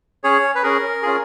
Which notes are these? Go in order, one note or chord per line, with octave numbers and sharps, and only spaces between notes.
C#4 G#4 C#5
B4
C#4 G#4 A#4
C#4 F4 G#4